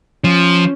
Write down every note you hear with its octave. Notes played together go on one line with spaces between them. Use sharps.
F3 C#4